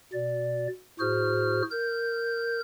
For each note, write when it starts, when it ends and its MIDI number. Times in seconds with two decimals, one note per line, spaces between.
0.13 0.68 47
0.13 0.68 74
1.00 1.62 45
1.00 1.62 66
1.00 1.62 68
1.00 1.62 72
1.00 1.62 89
1.71 2.61 70
1.71 2.61 91